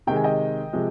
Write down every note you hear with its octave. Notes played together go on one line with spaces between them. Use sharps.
C3 D#3 G#3 G5
G#5
D#5 G5
C3 F3 G#3